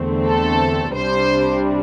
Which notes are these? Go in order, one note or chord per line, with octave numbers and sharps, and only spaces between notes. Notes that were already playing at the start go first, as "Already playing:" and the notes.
Already playing: E2 D3 A3 C4
A4
C2 C3 G3 D4 C5